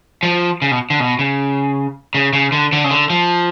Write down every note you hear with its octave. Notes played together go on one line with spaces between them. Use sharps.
F3
C#3
B2
D3
B2
C#3
C#3
C#3
D3
D3
C#3
D3
F3